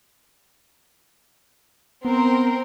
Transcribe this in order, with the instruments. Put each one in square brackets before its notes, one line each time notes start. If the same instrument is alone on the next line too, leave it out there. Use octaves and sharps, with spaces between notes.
[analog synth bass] B3 [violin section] C4 A#4